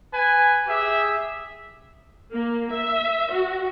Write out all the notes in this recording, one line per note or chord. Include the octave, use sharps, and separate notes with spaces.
B4 G#5
G4 G#4 E5
A#3
E5
F#4